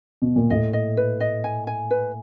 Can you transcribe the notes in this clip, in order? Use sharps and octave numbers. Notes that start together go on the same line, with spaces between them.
B2
A#2
A2 D#5
D#5
B4
D#5
G#5
G#5
B4